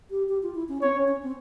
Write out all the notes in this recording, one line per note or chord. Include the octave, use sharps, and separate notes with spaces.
G4
G4
F4
E4
C#4
C4 C#5
C#4
C#4
C4